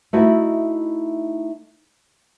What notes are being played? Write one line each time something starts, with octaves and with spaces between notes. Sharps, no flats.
A3 D#4 E4 F#4 D#5 E5